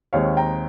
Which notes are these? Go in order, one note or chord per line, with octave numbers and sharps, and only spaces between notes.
D#2 D#3 G#3 C4 C#5 F5
G5 A#5